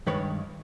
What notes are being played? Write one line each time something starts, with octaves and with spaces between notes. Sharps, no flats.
G2 D#3 G#3 B4 C#5